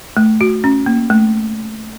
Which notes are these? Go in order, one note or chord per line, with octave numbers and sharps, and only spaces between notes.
A3
F#4
C#4
A#3
A3